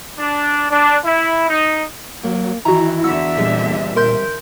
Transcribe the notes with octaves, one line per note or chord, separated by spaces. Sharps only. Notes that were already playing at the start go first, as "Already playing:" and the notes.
D4
D4
E4
D#4
F#3 A#3
D#3 E3 E4 F#4 A#5
E2 D3 F#4 E5 E6
A#2 G3 G#3 C4
A#4 C6 G6